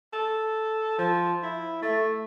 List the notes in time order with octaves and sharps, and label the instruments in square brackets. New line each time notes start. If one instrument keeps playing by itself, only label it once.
[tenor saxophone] A4
F3
E4
A3